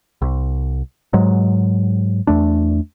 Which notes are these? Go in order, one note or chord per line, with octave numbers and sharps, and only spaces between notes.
C2
G#2 F#3 G#3
E2 A3 D4